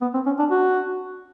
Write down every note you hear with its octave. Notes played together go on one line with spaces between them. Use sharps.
B3
C4
C#4
D4
F#4